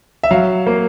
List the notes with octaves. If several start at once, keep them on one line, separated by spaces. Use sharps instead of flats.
E5
F#3 F5
A#3